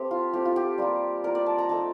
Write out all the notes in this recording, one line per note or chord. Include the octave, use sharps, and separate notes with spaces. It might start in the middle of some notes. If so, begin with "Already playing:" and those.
Already playing: A3 C4 G4
F4
A3 C4 F4 G4
F4
G4
G3 A#3 F4
G3 A#3 F4 A#4
D5
A5
A#5
A3 D#4 A5